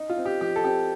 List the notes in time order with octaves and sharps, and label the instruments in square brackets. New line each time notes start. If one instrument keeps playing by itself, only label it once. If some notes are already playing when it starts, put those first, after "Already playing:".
Already playing: [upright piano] D#4
F4
C4
G4
F3 G4
A4
C4 G4